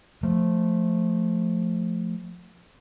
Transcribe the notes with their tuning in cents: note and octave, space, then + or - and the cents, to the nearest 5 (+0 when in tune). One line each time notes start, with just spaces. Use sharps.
F3 +5 A3 +0